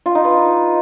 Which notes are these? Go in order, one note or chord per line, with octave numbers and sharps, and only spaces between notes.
F4
D#4
B4